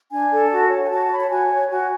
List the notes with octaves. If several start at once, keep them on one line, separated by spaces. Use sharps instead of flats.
D4 G#5
A4
F#4 A5
C#5
G#5
F#4 A5
C#5 B5
A5
F#4 G#5
C#5
F#4 G#5